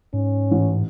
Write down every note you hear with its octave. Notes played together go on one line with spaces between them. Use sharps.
G#2 C#4
A1